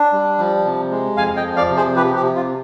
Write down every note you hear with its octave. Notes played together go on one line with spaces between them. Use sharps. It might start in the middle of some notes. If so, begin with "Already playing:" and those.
Already playing: D4
G3
F3
C3
G#3
F2 F5 G#5
D#5 G5
F3
D5 F5
C3
G#4 C5
F3 G4 B4
G4
C3
F4